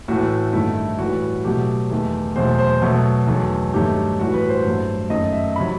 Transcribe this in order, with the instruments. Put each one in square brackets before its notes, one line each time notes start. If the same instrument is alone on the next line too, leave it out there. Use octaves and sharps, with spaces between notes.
[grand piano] A2 E3 A3 F#4
G2 D#3 A3 E4
A2 E3 G3 F#4
B2 F#3 A3 G4
E2 D#3 A3
E2 B2 F#3 A3 C5
C5
B2 F#3 A3
E2 D#3 F#3 A3
G2 D#3 F#3 A3 G4
A2 E3 G3 F#4
B4
C5
G2 F#3 A3
F#2 D#3 A3 D#5
E5
C3 F#3 B5